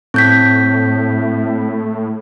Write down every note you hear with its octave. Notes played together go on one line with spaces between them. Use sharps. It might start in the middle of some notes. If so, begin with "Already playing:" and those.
A2 C4 G6 B6